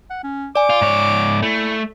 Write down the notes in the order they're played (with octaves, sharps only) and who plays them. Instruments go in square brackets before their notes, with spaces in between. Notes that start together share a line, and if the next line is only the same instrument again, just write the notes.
[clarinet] F#5
C#4
[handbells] D5 G#5 [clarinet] D6
[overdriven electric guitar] F4
G#2 C#5
[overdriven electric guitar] A3 [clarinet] E4